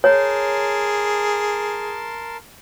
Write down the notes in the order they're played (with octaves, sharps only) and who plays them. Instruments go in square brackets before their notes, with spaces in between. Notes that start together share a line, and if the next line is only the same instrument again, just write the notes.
[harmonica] G#4 [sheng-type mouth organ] A#4 A5 C6 [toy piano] C#5